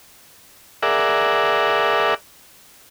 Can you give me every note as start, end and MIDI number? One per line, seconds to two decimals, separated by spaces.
0.83 2.14 68
0.83 2.14 70
0.83 2.14 74
0.83 2.14 76
0.83 2.14 78